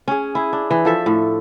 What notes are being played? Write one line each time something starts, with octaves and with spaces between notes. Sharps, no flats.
C#4 G#4
E4 G#4
D4
E3
F3 A4 E5
A2